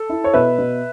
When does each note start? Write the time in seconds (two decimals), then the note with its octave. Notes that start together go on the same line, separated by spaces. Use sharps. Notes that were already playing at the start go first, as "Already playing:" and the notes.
Already playing: A4
0.09 E4
0.24 C#5
0.33 B2 B4 E5
0.58 B2